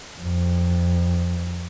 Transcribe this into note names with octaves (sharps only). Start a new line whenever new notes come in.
F2